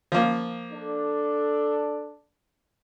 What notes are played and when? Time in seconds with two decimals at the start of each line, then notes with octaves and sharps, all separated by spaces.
0.12 F3 A#3
0.72 D4 A4